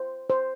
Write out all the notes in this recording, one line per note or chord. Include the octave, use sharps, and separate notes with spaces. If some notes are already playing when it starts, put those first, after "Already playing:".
Already playing: C5
C5